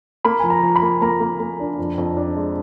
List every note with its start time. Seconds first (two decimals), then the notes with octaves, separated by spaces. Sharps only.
0.25 A#3 B5
0.39 F3 G#5
0.50 A#5
0.63 F3
0.76 B5
0.82 A#3
1.02 A#3 A#5
1.21 A#3
1.40 A#3
1.60 D4
1.79 F2
1.98 F2
2.17 D4
2.36 G#3